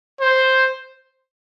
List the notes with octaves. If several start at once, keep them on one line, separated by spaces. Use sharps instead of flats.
C5